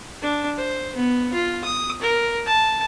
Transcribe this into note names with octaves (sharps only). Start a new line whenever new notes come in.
D4
C5
B3
F4
D#6
A#4
A5